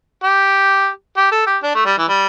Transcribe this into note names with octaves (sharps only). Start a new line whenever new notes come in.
G4
G4
A4
G4
D4
A3
G3
E3
G3